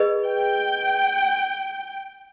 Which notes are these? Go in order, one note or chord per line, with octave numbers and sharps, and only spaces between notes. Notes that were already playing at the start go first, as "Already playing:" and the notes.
Already playing: G#4 B4 D#5
G5